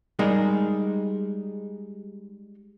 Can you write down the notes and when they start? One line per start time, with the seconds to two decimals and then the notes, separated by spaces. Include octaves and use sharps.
0.19 G3 G#3 D#4 G#4 A#4